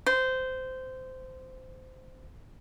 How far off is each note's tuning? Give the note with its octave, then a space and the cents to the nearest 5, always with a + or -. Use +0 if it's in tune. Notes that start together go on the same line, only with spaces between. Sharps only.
C5 -15